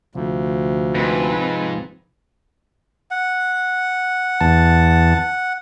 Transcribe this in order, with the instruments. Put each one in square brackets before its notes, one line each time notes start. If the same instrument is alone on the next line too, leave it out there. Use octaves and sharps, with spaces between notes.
[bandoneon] D2 [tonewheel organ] C3 F3
[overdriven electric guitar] G#2 [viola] C4 B4
[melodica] F#5
[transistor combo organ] E2 A5